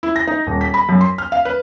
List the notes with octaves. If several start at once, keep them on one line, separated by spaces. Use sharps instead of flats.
E4
A#6
D#4
D#1
B6
B5
F#2
C6
F6
F5
B4